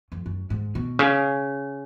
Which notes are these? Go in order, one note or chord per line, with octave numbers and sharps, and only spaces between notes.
F2
F#2
G#2
B2
C#3